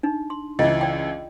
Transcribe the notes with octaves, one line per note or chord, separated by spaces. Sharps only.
D4 D#4
C6
C#2 E3 F4 D#5
D5 G5